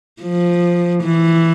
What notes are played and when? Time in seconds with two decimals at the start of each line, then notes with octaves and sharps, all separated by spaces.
0.22 F3
1.03 E3